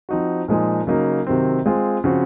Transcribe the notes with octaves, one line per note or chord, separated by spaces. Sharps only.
F3 C4 D#4 F#4
A#2 F3 G#3 D#4 G#4
C#3 F#3 A#3 D#4
C3 D#3 F#3 C4
G#3 C4 F4 G#4
C#3 F3 C4 F#4